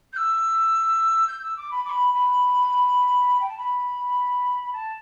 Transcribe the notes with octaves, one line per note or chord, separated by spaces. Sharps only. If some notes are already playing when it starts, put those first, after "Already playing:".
G6
E6
G6
E6
D6
B5
D6
B5
B5
G5
A5
B5
A5